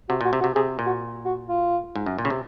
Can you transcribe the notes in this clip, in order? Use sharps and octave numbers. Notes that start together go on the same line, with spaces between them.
C3 F#4
A#2 F#4
C3
F#4
C3
C3 G#4
A#2
F#4
F#4
F4
G#2
F#2
A#2
C#3
C3